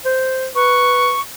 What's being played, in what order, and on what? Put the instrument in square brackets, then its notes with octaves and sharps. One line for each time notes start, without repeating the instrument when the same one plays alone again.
[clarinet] C5
[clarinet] B4 [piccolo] C#6